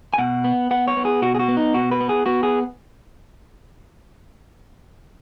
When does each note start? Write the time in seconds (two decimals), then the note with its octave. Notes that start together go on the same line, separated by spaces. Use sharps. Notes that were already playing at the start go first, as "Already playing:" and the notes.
0.14 G#5
0.18 B2 F#5
0.44 B3
0.71 B3 F#5
0.88 C#5
0.97 B3
1.05 G#4
1.22 B2 F#4
1.35 G#4
1.39 F#4
1.48 B3
1.57 D#4
1.74 B2 F#4
1.91 B4
2.01 B3
2.09 G#4
2.26 B3 F#4
2.43 G#4